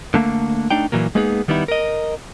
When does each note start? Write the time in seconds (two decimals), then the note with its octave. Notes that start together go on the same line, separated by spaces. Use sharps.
0.14 D3 A3 A#3
0.71 A3 D4 D#4 G5
0.92 A#2 E3 F#3 A#3
1.15 G#3 A#3 B3 D#4 G#4
1.48 D#3 G3 B3 D#4 E4
1.68 A#4 D#5